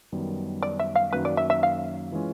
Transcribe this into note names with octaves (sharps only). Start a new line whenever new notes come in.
F#2 D#3 G3 B3
D5
E5
F5
F#2 D#3 F#3 A#3 C#4 B4
D5
E5
E5
F5
E3 G#3 C#4 F4